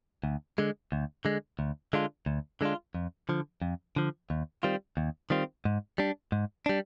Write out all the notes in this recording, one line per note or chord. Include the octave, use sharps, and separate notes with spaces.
D2
D3 G#3
D2
D3 G#3
D2
D3 G#3 D4 F4
D2
D3 G#3 D4 F4
F2
D3 F3
F2
D3 F3
D#2
D#3 G3 C4 F4
D#2
D#3 G3 C4 F4
G#2
G3 D4
G#2
G3 D4